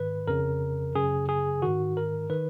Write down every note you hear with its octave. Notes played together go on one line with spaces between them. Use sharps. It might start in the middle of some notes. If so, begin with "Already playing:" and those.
Already playing: G#2 D#3 B4
F2 C#3 A#4
F#2 C#3 G#4
G#4
G#2 D#3 F#4
A#4
D#3 B4